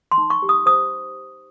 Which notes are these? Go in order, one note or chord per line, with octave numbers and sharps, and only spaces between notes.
C6
D#4
C#6
G4
D#6
C5 D#6